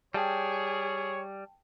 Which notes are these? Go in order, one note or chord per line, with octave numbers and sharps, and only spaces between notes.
G3 G#4 C#5 G5 A5